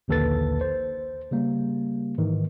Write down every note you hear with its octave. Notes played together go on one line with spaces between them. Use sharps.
A#1 D#2 D3 A4 B4 A6
C5
C#3 G3 A#3
G#2 D#3 E3